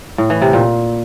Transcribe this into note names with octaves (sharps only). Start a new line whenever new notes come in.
A2
E3
C3
A#2